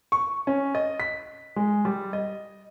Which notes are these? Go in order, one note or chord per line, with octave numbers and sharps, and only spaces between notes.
C#6
C#4
D#5
B6
G#3
G3
D#5